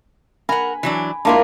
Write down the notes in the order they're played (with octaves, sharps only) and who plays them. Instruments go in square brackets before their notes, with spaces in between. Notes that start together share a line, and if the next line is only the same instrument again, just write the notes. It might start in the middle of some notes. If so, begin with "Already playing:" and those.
[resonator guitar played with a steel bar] A#4 F#5 [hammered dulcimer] G#5 B5
[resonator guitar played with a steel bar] E3 F#3 D4
[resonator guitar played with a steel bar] G#3 E4 F4 [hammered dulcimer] A#3 D4